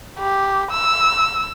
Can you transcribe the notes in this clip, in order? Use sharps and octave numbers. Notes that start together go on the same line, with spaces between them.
G4
E6